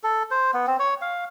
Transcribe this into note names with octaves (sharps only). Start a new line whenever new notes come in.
A4
C5
B3
C4
C#5
F5